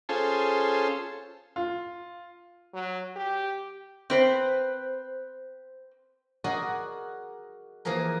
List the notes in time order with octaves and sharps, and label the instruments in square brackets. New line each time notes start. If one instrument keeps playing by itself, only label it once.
[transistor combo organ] C#4 F4 G#4 A4 C5
[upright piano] F4
[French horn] F#3
G4
[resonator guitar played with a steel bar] C4 B4 C5
[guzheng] F#4 G#4 A#4 D5 D#5 F#5
E3 F3 A#3 G#4 A#4